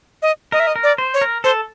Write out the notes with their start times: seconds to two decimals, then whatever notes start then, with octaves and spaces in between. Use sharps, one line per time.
0.22 D#5
0.52 A#4 D#5
0.60 E5
0.67 D#5
0.76 A#4
0.83 D5
0.98 C5
1.14 C#5
1.21 A#4
1.44 A4 C5